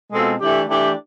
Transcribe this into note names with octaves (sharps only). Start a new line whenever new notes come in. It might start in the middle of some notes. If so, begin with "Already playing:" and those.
B2 G#3 C4 F4 A4
E3 A3 D4 G4
E3 A3 D4 G4